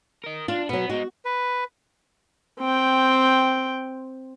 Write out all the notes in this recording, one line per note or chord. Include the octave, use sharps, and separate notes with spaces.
A#4 D#5
D4 F4
B2 F#3 B3
G#3 D#4 F#4
B4
C4 G5